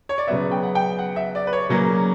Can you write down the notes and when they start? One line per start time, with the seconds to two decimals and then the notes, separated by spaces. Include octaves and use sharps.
0.09 C#5
0.18 D5
0.27 C#3 F#3 B3 E5
0.51 G5
0.63 F#5
0.75 G5
0.98 F#5
1.16 E5
1.35 D5
1.47 B4
1.53 C#5
1.69 C#3 F#3 A#3 C#4